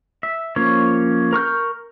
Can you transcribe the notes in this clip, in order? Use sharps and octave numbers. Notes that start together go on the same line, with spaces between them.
E5
F3 A#3 C#4 C#5
A#4 C#6 F6 G6